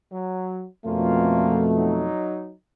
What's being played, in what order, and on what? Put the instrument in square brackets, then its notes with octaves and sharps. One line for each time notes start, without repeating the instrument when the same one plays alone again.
[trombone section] F#3
[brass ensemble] F2 B2 A3 [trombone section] A#3 C#4 F4
[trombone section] F#3 D#4